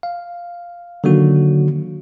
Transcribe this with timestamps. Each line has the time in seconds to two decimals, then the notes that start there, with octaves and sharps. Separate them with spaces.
0.03 F5
1.04 D3 D#3 F#3 A#3 F#4